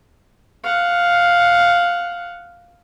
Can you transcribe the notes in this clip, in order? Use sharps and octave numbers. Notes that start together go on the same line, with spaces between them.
F5 F#5